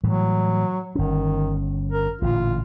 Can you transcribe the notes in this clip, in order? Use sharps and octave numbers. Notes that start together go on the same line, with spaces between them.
A2 E3 F#3 G3
G1 D#3 C#4
A#4
A1 A#2 D3 F4